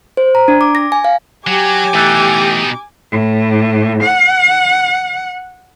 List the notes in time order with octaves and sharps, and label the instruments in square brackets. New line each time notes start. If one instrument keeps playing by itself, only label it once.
[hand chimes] C5
A#5
D4
D6
A#6
G#5
F5
[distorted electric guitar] F#3 [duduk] G4 [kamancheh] G#5 D6
[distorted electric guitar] B2 D#4 [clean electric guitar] E3 A3
[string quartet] A2
F#5